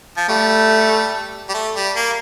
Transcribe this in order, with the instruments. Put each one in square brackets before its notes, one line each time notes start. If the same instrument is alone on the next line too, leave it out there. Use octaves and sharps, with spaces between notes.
[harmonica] F3
[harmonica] G3 [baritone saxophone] A3
[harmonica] G3
A3
G3
A#3